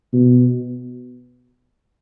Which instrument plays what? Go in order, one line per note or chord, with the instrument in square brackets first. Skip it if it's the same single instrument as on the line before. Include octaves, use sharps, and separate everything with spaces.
[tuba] B2